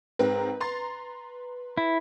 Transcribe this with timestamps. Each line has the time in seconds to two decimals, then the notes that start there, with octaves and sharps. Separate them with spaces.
0.19 G#2 C4 A#4 B4
0.60 A#5 C6 A6
1.77 E4